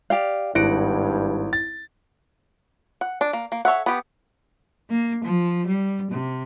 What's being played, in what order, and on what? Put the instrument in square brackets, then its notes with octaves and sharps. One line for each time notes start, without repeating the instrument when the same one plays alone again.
[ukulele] G4 D5 F5
[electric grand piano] G#1 D7 [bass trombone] G2 [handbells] E4 [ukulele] F#5
[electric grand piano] A6
[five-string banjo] F#5
D4
A#3
A#3
A4 C#5 E5 F#5
B3 G4
[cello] A#3
F3
G3
C3